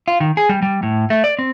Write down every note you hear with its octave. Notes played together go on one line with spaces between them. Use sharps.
F4
D#3
G#4
G3
G3
A2
A3
D5
C4